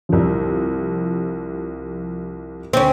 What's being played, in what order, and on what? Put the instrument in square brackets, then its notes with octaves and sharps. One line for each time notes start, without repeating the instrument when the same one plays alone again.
[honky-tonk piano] C2 F3
[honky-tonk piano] D2 [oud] C4 C#4